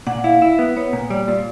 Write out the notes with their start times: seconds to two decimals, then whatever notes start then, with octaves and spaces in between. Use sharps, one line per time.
0.07 A#2 F#5
0.24 E4 F5
0.41 E4 E5
0.59 B3
0.76 B3 C#5
0.93 A#2
1.10 G3 D5
1.28 A#2